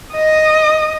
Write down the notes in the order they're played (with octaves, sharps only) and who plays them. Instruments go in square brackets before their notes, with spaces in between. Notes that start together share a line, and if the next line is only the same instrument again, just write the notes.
[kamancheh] D#5 D#6